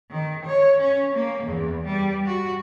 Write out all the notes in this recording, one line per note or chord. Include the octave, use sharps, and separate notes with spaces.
D#3
C#5
C#4
A#3
E2
G3
F#4